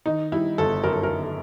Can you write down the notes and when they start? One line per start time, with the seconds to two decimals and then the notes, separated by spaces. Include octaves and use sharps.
0.06 D#3 D#4
0.32 G3 E4
0.58 G1 A4
0.84 F#2 A#4
0.93 A4
1.03 A#4
1.10 G1
1.23 A4